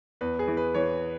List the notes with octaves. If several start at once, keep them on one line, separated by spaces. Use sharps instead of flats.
E2 B4
G#4
E3
B4
E3 C#5